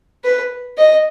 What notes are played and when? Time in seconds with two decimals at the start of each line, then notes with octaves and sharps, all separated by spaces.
0.24 B4
0.77 D#5